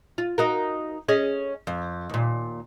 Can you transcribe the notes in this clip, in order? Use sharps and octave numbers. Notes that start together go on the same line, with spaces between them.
F4
D#4 F#4 A#4
C#4 G#4 D#5
F2
D#2 A#2